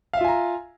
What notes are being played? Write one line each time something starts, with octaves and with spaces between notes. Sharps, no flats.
F4 E5 F5 G#5 A#5